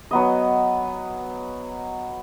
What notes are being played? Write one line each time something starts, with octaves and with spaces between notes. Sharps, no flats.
F#3 B3 D#5